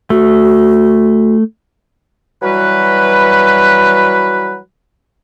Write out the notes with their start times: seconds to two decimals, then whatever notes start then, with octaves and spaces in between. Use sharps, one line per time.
0.10 A3 F#4
2.43 E3 F#3 G3 F#4 B4